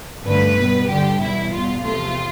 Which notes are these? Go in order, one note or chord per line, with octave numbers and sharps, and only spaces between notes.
G2 D3 A3 B4
B2 G3
G2 D3 G3 G4
E2 B2 G3 E4
E2 B2 G3 F4
E2 C3 F3 A3 F4